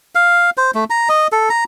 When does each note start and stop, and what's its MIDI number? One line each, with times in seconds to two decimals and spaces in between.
0.15 0.50 77
0.57 0.71 72
0.75 0.84 57
0.90 1.09 82
1.09 1.27 75
1.32 1.49 69
1.50 1.64 82